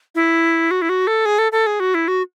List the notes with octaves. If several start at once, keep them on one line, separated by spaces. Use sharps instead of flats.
E4
F#4
E4
F#4
A4
G#4
A4
A4
G#4
F#4
E4
F#4